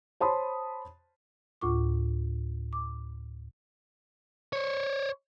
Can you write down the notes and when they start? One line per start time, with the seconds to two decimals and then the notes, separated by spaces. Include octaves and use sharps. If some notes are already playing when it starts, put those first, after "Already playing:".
0.20 C5 C#5 A5 B5 C6 D#6
1.61 D2 A2 F4 C#6 D6
2.73 D6
4.53 C5 C#5